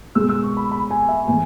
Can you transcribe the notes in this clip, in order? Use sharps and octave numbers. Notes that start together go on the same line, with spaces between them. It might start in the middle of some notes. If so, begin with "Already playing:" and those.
B2 G#3 B3 E6
E6
C#6
B5
B5
G#5
E5
A2 E3 G#3 B3 G#5